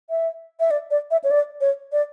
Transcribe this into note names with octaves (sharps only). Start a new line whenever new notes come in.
E5
E5
D5
D5
E5
C#5
D5
C#5
D5